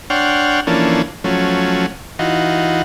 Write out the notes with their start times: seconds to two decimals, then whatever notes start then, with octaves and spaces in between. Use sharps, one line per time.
0.10 D4 C#5 F#5 G5 C6 F6
0.67 E3 F3 A#3 C#4 D4 A4
1.24 F3 F#3 A3 C#4
2.19 E3 D#4 F4 F#4